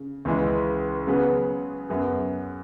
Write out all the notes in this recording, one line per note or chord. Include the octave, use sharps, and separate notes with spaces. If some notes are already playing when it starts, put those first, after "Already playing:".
Already playing: C#3
C#2 C#3 E3 G#3
C#3 F#3 B3 G#4 B4
F#2 F#3 B3 G#4